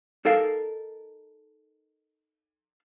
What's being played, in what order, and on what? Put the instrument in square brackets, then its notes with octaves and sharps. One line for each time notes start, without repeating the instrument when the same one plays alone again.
[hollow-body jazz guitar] D#4 A4 A#4 F5